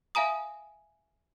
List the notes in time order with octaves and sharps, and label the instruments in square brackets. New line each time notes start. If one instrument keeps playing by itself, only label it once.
[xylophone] E5 F5 G#5 A#5 D#6